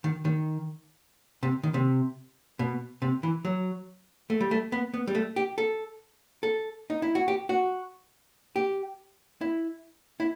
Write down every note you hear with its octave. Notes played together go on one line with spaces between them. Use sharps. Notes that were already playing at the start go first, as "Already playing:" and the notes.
D#3
D#3
C3
D#3
C3
B2
C3
E3
F#3
A3
G3
A3
B3
B3
G3
A3
G4
A4
A4
D#4
E4
F#4
G4
F#4
G4
E4
E4